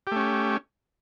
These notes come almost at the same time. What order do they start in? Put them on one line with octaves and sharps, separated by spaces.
G4 A3 C#4